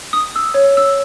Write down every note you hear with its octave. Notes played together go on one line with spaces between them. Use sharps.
D#6
E6
C#5
E6